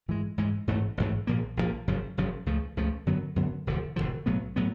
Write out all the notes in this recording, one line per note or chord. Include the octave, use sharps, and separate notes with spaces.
G#2 E3 G#3
G#2 E3 G#3
A1 G#2 E3 A3
A1 G#2 E3 A3
A#1 A#2 F3 A#3
A#1 A#2 F3 A#3
F#1 F#2 C#3 F3
F#1 F#2 C#3 F3
C#2 C#3 F3 A3
C#2 C#3 F3 A3
F#2 D3 F#3 B3
F#2 D3 F#3 B3
E1 D2 D3 F3
E1 D2 D3 F3
B1 A2 F#3 B3
A2 F#3 B3